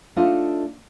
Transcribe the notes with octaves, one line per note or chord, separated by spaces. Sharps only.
A3 D4 D#4 F4 A4 D#5